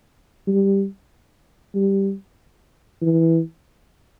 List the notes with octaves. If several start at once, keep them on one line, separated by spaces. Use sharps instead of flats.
G3
G3
E3